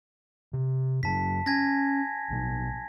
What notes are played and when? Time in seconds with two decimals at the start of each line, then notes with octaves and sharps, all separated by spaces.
0.53 C3
1.03 F#2 C#3 F#3 A5 B6
1.46 C#4 G#5 G#6 A#6
2.30 A#1 B2